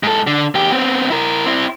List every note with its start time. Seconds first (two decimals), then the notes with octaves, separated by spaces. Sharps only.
0.03 G#2 A4
0.27 D3
0.55 E2 G4
0.71 B3 C4
1.10 E4 A#4
1.46 C4 E4